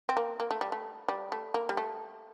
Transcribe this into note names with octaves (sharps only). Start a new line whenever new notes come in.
C4
A#3
A#3
A3
G3
A3
G3
A3
A#3
G3
A3